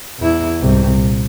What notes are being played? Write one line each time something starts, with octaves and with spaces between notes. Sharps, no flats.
E2 E4
C2 G#2
A#2